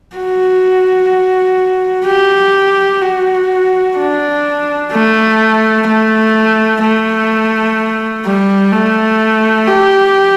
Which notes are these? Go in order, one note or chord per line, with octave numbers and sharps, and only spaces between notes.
F#4
G4
F#4
D4
A3
A3
A3
G3
A3
G4